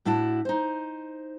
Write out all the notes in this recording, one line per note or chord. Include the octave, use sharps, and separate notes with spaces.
A2 D4 E4 F#4 A5
D#4 C5